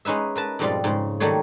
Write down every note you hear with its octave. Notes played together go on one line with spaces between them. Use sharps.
G#3 C#4 D#4 B4 E5
A#4 B4 A5
F2 G#2 B2 G3 F4 D5
G#2 C#3
D#3 F#3 G3 A3 A#3 C#5